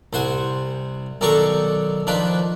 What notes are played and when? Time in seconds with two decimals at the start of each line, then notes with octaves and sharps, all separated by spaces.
0.13 C2 C5 F#5 G#5
1.21 B1 D#3 D4 A4 A#5 C#6
2.07 D#3 F3 D4 B4